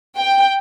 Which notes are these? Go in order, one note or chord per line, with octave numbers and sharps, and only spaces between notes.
G5